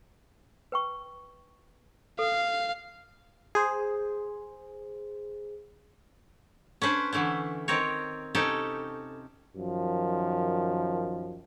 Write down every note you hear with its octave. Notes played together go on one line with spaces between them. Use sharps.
B4 G5 C#6
A4 F5
G#4 C5
C#4 D4 B4 C5
D3 E3 A3 C#4
D#3 C4 A#4 C#5
C3 C#4 D#4 G4 A4
F#2 D#3 F3